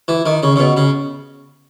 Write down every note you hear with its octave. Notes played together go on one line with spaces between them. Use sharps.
E3
D#3
C#3
C#3
B2
C#3